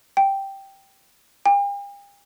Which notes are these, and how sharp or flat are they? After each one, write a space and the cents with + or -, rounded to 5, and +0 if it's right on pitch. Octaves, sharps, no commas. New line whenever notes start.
G5 +0
G5 +45